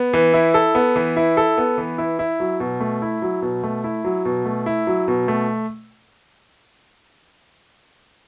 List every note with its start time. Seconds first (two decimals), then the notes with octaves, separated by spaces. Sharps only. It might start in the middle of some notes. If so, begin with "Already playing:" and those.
Already playing: B3
0.14 E3
0.34 E4
0.54 A4
0.75 B3
0.96 E3
1.17 E4
1.37 A4
1.58 B3
1.78 E3
1.98 E4
2.19 E4
2.40 F#3
2.60 B2
2.80 A3
3.02 E4
3.22 F#3
3.42 B2
3.63 A3
3.84 E4
4.05 F#3
4.25 B2
4.45 A3
4.66 E4
4.87 F#3
5.08 B2
5.28 A3